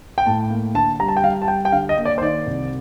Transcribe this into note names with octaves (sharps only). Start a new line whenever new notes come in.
G5
A2 A5
A#3
D3 A5
G3 A#5
A5
G5
G3 F5
A5
G3 G5
G5
D3 F5
D#5
A#3
D5
C5
D#3 D5
C2